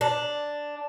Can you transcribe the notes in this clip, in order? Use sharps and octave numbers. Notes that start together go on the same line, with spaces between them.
D4